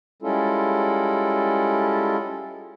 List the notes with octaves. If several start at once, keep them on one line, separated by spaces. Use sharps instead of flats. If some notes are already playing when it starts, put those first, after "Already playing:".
G3 G#3 C#4 E4 F4 A4